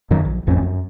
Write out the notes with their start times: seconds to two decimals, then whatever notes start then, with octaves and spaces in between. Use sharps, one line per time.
0.11 F#2 D#3 F#3
0.25 A#1
0.47 A1 F2 C4 C#4
0.62 F#2